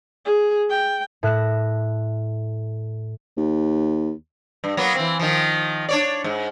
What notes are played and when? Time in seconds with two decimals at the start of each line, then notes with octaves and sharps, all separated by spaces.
0.25 G#4
0.69 G5
1.23 A2 E5 F#6 A#6 E7
3.37 D#2
4.64 G2
4.77 F#3 A#3 B3
4.95 E3 C4
5.19 D#3 F3
5.89 D4 C#5 D5
6.24 G#2